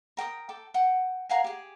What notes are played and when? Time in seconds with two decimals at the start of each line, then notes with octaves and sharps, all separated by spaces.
0.17 A#4 G5 D6 D#6
0.49 A4 G5 D6
0.74 F#5 G5
1.29 A#4 F5 F#5 G#5
1.44 G4 G#4